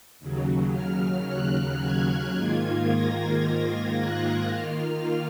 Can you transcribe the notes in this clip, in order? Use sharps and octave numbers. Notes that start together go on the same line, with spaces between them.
D#2 C#3 F#3
F6
F#6
G#6
G#2 D#3 A#3 F4
A#6
G#6
F#6
D#3 A#3 F4 F6